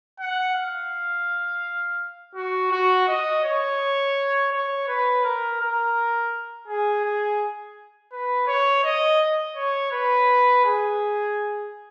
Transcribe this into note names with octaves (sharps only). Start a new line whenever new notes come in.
F#5
F5
F#4
F#4
D#5
C#5
C#5
B4
A#4
A#4
G#4
G#4
B4
C#5
D#5
C#5
B4
G#4